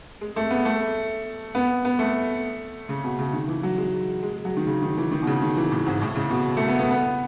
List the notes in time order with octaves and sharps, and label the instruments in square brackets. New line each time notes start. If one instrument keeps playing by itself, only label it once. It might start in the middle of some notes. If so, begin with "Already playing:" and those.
[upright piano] G#3
A3
B3
A3
B3
B3
A3
C#3
B2
C#3
D#3
E3
F#3
G#3
G#3
G#3
F#3
D#3
C#3
D#3
E3
D#3
B2
C#3
D#3
E3
A2
G#2
A2
C#3
B2
A3
B3
B3
B3